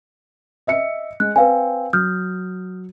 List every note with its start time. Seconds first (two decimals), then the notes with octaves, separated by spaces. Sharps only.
0.67 D#5 E5 C#7
1.20 G#3 F#6
1.36 C4 B4 F5 G#5
1.93 F#3 D#6 F6 G6